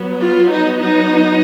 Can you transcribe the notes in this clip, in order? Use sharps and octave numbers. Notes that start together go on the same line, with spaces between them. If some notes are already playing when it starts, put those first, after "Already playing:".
Already playing: F#3 B3
F4
D#4
D#4